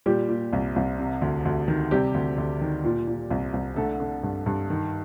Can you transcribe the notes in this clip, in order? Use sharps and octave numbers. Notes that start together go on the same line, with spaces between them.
A#2 G3 G4
A#2
C2
C2
C3
D2
D2
D#3
C3 G3 G4
D2
D2
D#3
A#2
A#2
C2
C2
D3 A3 A4
D3
G2
G2
D#3